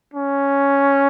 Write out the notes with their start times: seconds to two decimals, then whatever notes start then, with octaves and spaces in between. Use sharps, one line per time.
0.14 C#4